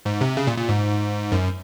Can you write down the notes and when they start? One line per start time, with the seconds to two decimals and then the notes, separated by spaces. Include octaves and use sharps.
0.05 G#2
0.21 C3
0.37 C#3
0.47 A#2
0.58 A#2
0.69 G#2
1.32 F#2